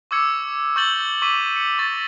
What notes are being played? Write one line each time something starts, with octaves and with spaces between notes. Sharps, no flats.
C#6 D6 E6 G#6 C#7
C#6 E6 G6 A6 F#7 G7
C#6 D6 E6 B6 D#7
C#7
C#6 D6 A6 A#6